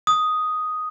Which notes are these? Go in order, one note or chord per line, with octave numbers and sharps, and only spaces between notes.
D#6